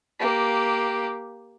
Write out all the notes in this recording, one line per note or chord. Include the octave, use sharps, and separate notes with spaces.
A#3 G4